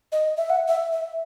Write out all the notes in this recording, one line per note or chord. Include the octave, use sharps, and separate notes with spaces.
D#5
E5
F#5
E5
E5